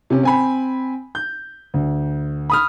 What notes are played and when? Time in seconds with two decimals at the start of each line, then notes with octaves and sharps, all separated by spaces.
0.10 C3 C#4
0.23 C4 G#5 B5
1.15 G6
1.74 D2
2.50 B5 D#6 F6